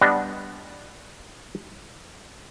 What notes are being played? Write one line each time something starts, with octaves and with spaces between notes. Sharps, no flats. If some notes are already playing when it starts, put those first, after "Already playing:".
G3 B3 D4 D#5